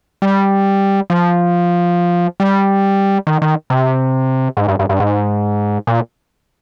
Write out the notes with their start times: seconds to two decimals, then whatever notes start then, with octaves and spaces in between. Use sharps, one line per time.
0.22 G3
1.10 F3
2.40 G3
3.27 D#3
3.42 D#3
3.70 C3
4.57 G#2
4.68 G2
4.79 G2
4.89 G2
5.00 G#2
5.87 A#2